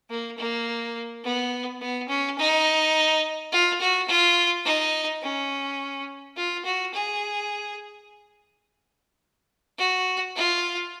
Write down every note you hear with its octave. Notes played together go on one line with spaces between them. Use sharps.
A#3
A#3
B3
B3
C#4
D#4
F4
F#4
F4
D#4
C#4
F4
F#4
G#4
F#4
F4